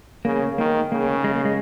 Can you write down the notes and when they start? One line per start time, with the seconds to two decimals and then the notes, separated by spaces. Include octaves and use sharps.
0.25 C#3 A#3
0.58 D#3 A#3
0.92 C#3 A#3
1.24 G#3
1.35 A#3
1.45 G#3